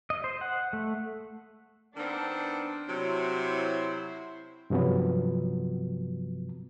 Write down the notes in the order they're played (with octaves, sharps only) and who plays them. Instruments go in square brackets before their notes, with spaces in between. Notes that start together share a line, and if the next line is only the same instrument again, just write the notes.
[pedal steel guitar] D#5
C5
F#5
A3
[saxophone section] D#3 B3 C4 [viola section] D4
[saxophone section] C3 F#3 [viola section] E4 C5
[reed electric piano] G2 C3 F3 F#3 B3